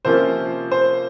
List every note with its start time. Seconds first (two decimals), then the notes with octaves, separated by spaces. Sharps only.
0.05 C3 F3 A#3 C#4 F4 C5
0.72 C5